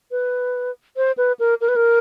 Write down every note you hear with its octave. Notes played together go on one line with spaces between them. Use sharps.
B4
C5
B4
A#4
A#4
B4
A#4